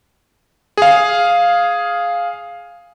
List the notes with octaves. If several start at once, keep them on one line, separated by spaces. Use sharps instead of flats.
G#4 F5